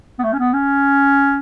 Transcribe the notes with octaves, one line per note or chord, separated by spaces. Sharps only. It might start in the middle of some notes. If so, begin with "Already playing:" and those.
B3
A3
C#4
B3
C#4